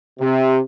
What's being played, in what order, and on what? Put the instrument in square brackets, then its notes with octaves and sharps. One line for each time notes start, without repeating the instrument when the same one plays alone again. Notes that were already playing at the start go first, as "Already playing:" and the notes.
[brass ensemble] C3